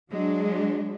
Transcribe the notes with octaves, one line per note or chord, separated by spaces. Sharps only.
F#3 G#3 D4